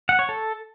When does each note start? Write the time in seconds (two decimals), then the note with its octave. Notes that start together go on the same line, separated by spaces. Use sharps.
0.09 F#5
0.19 C#5
0.29 A4